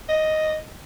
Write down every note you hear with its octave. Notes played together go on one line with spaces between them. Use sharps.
D#5